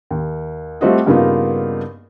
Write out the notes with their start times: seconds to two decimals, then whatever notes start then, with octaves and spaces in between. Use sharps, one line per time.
0.11 D#2
0.81 G3 A3 C4 F4 F#4 D#5
1.06 G2 C#3 A#3 B3 D#4 F4